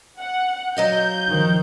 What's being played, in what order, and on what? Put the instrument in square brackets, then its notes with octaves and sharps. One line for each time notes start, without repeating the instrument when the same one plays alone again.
[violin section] F#5
[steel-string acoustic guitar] F#3 D#5 F5 [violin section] G6
[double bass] D#3 F3